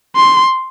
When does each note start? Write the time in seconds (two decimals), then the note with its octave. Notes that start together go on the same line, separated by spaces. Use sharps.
0.17 C6